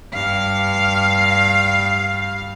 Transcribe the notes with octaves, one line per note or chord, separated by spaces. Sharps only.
G2 F5